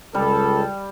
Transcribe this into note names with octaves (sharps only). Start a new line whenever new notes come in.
C#2 G3 A4